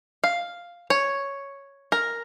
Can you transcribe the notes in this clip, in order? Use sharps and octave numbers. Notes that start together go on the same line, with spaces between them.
F5
C#5
A#4